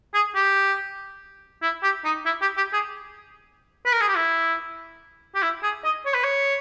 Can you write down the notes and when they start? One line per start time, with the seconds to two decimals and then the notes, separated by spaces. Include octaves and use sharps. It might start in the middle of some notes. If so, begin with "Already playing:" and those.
0.14 G#4
0.35 G4
1.62 E4
1.83 G4
2.05 D#4
2.26 E4
2.41 G4
2.57 G4
2.73 G#4
3.86 B4
3.92 A#4
4.01 G#4
4.08 G4
4.16 E4
5.35 G4
5.42 E4
5.63 G#4
5.84 D#5
6.06 C#5
6.15 B4
6.24 C#5